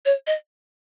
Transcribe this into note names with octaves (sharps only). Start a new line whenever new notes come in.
C#5
D#5